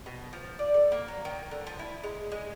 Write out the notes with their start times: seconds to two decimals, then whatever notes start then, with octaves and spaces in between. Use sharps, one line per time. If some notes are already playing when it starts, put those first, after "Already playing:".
0.06 B2
0.33 F3
0.59 D5
0.74 A4
0.92 A#3
1.08 F#3
1.25 D#3
1.51 D3
1.67 F3
1.79 E4
2.03 G#3
2.32 G#3